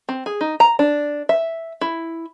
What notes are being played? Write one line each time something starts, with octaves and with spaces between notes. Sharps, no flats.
C4
G#4
D#4
A#5
D4
E5
E4